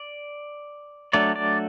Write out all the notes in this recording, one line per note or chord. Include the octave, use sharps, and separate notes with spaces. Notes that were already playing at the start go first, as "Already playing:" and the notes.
Already playing: D5
F#3 A3 D4 D5
D5